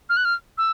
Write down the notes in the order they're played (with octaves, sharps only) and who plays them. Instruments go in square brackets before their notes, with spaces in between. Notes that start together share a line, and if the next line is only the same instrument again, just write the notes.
[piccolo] F6
F#6
F6
E6